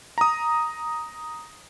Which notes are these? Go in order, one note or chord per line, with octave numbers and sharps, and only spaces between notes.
A#5 D#6